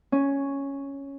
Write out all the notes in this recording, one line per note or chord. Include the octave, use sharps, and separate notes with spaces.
C#4